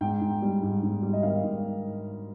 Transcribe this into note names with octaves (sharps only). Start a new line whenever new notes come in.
G#2 G5
G#2
G3
G#2
G#2
G3
D#5
D#3 F5
G#2